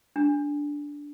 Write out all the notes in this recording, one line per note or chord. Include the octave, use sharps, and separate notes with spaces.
D4